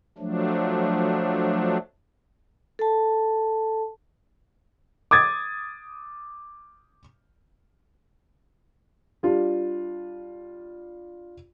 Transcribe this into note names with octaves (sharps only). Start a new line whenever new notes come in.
F3 F#3 A3 D4
A4 A5
D6 D#6 G#6 A6
G3 D4 F4